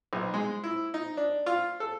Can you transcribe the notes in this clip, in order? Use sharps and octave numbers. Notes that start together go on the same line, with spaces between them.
B1
G#3
E4
D#4
D4
F4
A4